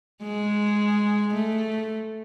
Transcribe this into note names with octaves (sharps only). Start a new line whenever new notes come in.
G#3
A3